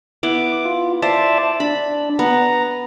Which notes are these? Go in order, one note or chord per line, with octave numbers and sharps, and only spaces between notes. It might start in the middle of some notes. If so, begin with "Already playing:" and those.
B3 E4 D6
F4
C5 D5 E5 A5
D4 B5
B3 A#5